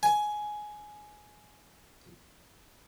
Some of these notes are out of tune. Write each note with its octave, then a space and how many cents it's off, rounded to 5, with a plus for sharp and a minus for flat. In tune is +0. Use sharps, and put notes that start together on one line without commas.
G#5 +10